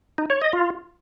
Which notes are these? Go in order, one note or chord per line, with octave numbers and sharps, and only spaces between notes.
D#4
C#5
D#5
F4